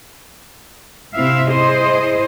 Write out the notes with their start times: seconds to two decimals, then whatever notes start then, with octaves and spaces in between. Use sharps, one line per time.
1.13 C3 C4 E4 E5 F5
1.49 E4 G#4 C5 D#5